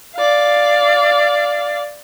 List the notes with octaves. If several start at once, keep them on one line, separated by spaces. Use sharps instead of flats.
D5 F5